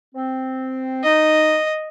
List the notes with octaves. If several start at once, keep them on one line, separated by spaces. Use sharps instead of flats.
C4
D#4 D#5